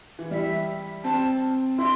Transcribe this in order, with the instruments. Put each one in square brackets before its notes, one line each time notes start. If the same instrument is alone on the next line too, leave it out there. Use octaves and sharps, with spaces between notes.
[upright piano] E3
[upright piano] G3 [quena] E5
[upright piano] C4 [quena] A5
[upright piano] E4 [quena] C6